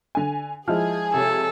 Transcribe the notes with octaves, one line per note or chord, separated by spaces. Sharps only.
D3 G#5
F3 G#3 E4 G#4 F6
C3 A4 C#5